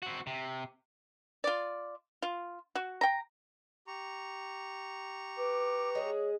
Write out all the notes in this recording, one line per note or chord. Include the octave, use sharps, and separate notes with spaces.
C4 F#4
C3
F4 D5
F4
F#4
G5 A#5
G4 A#5 C#6
B4 D6
G#3 G#4 C#5